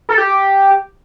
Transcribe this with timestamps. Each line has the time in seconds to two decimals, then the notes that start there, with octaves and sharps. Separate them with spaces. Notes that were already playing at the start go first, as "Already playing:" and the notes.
0.09 A4
0.18 G4